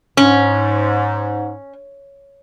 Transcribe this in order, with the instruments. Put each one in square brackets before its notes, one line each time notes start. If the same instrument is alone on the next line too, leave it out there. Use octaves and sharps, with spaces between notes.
[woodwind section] G#2 [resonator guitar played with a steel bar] C#4